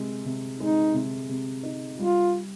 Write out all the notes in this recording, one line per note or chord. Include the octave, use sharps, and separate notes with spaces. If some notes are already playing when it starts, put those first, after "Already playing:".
Already playing: C3 G#3
C3
G#3 D#4
C3
C3
D#4
G3 F4